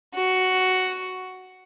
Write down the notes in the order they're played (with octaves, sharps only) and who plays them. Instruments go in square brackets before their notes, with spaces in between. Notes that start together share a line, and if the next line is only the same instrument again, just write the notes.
[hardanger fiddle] F#4